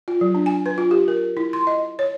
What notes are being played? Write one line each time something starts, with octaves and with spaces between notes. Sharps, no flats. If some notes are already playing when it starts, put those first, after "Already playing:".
F4
F#3
D4
G#5
B4
F4
G4
A#4
E4
C6
D#5
C#5